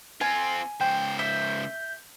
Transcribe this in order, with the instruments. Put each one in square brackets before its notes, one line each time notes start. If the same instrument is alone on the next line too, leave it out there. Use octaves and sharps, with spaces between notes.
[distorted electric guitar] C4 F4 [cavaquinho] G#5
[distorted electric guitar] C#2 C5 [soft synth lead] G5
[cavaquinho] E5 [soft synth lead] G6